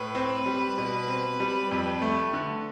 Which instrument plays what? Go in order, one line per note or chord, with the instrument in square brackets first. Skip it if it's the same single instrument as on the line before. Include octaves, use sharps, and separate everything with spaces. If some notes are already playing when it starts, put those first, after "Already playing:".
Already playing: [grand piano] A2 [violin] B4
[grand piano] C4
G3
B2
C4
G3
F2
A3
D3